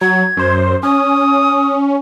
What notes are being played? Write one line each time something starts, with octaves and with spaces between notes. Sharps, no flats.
F#3 G#6
F#2 C5
C#4 D#6